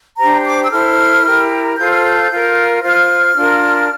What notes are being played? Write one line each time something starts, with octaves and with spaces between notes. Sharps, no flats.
D4 G4 C5 A#5
D6
E6
E4 A4 C5 F6
E4 G4 A#4
F4 A4 C5 G6
F6
G6
F4 A#4
F4 C5 F6
D4 F4 A#4